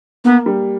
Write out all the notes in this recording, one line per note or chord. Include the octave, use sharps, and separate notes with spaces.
A#3 B3
G3